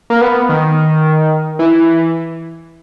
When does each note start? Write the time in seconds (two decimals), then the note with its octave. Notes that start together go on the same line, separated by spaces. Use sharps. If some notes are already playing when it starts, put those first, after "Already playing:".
0.10 A#3
0.21 B3
0.49 D#3
1.59 E3